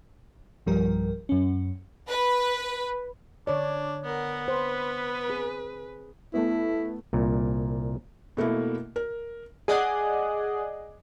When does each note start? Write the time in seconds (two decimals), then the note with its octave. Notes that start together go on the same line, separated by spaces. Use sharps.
0.66 B1 G2 F3 G3 A#4
1.29 F#2 C#4
2.09 B4
3.47 D3 D4 C#5 D5
4.04 B3 A#4 F#5
4.48 B4 C5
5.28 C4 G#4
6.34 A3 B3 E4
7.13 C2 A#2
8.37 B2 A3 A#3 E4
8.96 A#4
9.68 G#4 D5 D#5 F#5 G#5